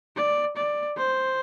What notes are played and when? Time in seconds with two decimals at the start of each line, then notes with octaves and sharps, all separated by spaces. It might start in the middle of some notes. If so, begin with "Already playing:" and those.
0.16 D5
0.57 D5
0.97 C5